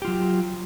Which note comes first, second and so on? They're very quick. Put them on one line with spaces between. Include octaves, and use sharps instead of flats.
G4 F4 F#3